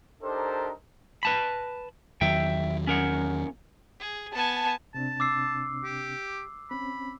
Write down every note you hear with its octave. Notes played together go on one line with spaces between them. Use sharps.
D4 D#4 G4 A4 A#4 C5
B4 A5 B5
E2 D#3 F#3 E5 G5
C#4 A#4 F#5
G#4
B3 G#5 A5
C3 C4 D4 A5
D6 E6 C7
G4
C4 C#4 B5